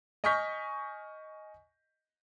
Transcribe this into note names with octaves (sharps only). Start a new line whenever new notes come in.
D#5 G#5 C#6 F6 G6 B6